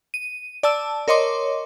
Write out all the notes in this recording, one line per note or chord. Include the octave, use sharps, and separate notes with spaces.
D#7
D5 A5 E6
A#4 C#5 D#5 C6 D6